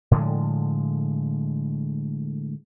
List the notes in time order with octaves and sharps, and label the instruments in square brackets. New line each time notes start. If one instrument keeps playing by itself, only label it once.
[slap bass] A2 D3 F3 G#3